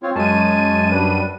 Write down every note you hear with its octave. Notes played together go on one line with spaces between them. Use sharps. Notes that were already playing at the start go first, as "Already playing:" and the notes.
C4 F4 C#5
F#2 G#3 G#5 A5 D#7
G3 D4 B4